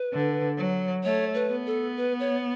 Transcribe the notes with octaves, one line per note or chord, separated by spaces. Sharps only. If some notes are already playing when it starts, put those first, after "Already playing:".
Already playing: B4
D3
F#3
A3 C#5
B4
B3
A4
B4
C#5